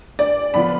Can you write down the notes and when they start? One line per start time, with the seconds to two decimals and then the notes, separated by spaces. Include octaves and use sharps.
0.19 D5
0.54 D3 F3 B3 D4 F4 B5